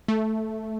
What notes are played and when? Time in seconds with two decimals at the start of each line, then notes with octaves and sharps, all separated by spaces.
0.08 A3